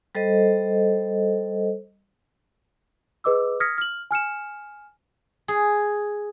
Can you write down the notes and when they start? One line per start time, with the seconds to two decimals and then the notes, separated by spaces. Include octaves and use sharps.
0.15 G3 A4 C5 D#5
3.24 G#4 B4 D#5 D6 E6
3.60 D#6 F6 G#6 A#6 B6 C#7
3.78 F6 F#7
4.11 G#5 F6 C#7 E7
5.48 G#4